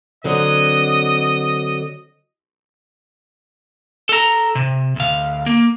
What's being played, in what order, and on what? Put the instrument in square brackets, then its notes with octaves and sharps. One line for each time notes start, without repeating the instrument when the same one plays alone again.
[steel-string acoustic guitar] D3 F#3 C4 [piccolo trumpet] D#5
[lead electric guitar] A4 A#5
C3
D2 F5
A#3